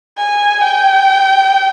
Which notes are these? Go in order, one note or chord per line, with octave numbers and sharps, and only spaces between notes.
G#5
G5